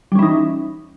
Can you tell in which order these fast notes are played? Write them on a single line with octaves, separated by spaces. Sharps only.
G3 C#4 E3 D#4